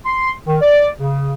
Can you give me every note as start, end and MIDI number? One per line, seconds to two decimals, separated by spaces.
0.06 0.32 84
0.47 0.57 51
0.62 0.88 74
1.00 1.33 49